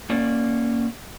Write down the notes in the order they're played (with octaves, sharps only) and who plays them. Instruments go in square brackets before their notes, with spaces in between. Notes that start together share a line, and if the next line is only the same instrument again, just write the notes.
[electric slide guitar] A#3 C#4 D5